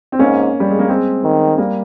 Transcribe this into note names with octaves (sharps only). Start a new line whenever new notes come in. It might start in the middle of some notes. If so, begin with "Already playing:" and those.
C4
G#2 A#3 C#4
G3
G#3
A#3
G#3 C4
D#3
G3 A#3